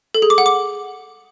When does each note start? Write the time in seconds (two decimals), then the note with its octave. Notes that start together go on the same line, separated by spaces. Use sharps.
0.15 A4
0.22 G#4
0.30 D6
0.38 F#5
0.46 D6